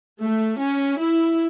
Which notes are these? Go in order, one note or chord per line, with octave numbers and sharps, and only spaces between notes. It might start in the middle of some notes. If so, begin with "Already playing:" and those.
A3
C#4
E4